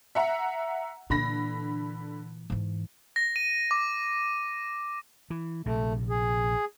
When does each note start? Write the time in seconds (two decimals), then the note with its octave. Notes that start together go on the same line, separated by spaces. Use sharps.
0.15 E5 F#5 A#5
1.10 A#2 D3 E3 B5 A#6
2.50 G#2 E3
3.16 A#6
3.36 D#7
3.71 D6
5.30 E3
5.66 A#1 C3 A3
6.10 G#4